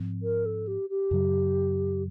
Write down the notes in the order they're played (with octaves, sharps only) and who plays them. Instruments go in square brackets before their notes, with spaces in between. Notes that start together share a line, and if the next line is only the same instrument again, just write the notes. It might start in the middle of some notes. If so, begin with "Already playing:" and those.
Already playing: [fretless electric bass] G#2 F3 C4
[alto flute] A#4
A4
G4
G4
[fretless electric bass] F#2 C#3 F#3